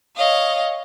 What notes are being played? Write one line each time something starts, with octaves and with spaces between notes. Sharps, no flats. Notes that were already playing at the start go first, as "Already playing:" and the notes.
C#5 D#5 F5